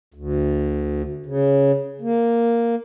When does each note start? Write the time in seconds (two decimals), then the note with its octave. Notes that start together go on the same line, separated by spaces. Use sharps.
0.14 D2
1.26 C#3
2.01 A#3